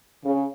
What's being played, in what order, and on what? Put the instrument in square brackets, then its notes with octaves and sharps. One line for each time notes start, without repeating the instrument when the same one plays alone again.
[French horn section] C#3